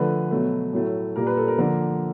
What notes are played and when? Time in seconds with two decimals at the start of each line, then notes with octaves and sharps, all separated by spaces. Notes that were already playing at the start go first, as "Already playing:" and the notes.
Already playing: D3 F3 A3 B4
0.31 B2 F#3 A3
0.73 A2 F#3 A3
1.16 A#2 G3 A#3 A#4
1.27 B4
1.37 A4
1.48 A#4
1.58 D3 F3 A#3 A#4